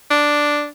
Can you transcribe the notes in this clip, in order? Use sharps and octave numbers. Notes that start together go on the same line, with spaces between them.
D4